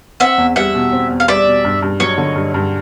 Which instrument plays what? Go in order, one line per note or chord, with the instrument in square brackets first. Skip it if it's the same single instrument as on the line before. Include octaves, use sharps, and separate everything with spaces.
[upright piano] C4 [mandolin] E5 F#5
[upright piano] E2
[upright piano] G3 [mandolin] E5 F#5
[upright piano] B2
C4
E2
[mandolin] F5
[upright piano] G3 [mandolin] D5 E5
[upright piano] B2
G2
G2
[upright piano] F#3 [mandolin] C#5 D#5
[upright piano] D3
G2
G2